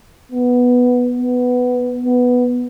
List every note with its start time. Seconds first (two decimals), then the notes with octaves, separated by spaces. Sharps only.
0.32 B3
1.18 B3
2.05 B3